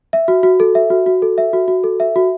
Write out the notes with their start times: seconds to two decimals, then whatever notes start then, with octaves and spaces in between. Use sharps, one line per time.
0.13 E5
0.28 F#4
0.43 F#4
0.60 A4
0.75 E5
0.90 F#4
1.06 F#4
1.22 A4
1.38 E5
1.53 F#4
1.68 F#4
1.84 A4
2.00 E5
2.16 F#4